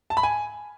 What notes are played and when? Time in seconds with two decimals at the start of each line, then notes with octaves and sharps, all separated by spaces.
0.10 A5
0.17 B5
0.23 G#5